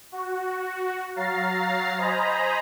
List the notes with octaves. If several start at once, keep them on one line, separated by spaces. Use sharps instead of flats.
F#4
F#3 F5 A#5 A6 C7
C5 D#5 G#5 A#5 B5